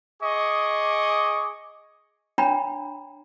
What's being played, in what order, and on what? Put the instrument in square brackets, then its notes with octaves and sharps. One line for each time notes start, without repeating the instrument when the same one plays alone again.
[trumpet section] G#4 D#5 C#6 D6
[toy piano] D4 C#5 G5 A#5 B5